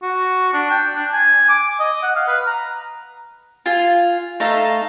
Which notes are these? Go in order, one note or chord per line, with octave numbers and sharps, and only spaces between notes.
F#4
D4
G5
D4
G#5
D6
D#5
F#5
F5
B4
A#5
F4 G#5
A3 D#4 F5